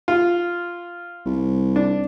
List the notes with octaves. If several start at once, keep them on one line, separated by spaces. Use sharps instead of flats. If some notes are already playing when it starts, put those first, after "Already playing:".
F4
C2
D4